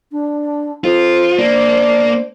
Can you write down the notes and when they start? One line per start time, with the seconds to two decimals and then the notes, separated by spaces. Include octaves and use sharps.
0.12 D4
0.84 F2 F4 C5
1.39 A#3 D4